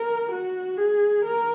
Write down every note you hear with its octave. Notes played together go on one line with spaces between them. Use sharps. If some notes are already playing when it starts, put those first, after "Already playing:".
Already playing: A#4
F#4
G#4
A#4